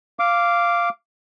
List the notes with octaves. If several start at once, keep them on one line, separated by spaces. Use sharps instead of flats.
F5 D6